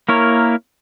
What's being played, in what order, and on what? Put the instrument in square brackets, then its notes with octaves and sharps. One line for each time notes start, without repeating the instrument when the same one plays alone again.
[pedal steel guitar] A#3 E4 A#4 C#5